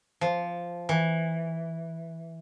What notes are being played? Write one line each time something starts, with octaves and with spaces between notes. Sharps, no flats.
F3
E3